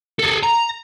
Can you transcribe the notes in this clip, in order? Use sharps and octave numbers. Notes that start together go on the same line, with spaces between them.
G#4 A4
A#5